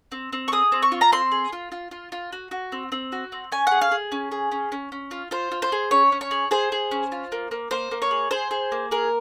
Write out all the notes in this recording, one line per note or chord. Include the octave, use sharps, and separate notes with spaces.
C4
C4
C#6
G#4 D#6
C4
C#6
F4
A#5
C4 C6
G#4
F4
F4
F4
F4
F#4
F#4
C4
C4
F#4
C4
C#4 G#5
G#4 F#5
F5
G#4
C#4
G#4
C#4
C#4
C#4
F4
F4 C5
F4
C5
G#4
C#4 C#5
C#4
C#5
G#4
G#4 C5
G#4
C#4
F4
A#3
A#3
A#3 C5
A#3
C#5
G#4
G#4 C5
G#4
A#3
G#4 A#4